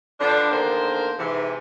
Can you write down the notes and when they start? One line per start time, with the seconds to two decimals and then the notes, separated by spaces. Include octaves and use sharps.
0.20 D3 F3 B3 D4
0.50 E2 D3 D#3 A#3 A#4 C5
1.18 G#2 C3 E3